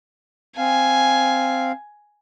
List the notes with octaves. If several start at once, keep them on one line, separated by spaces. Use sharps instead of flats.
C4 F5 G#5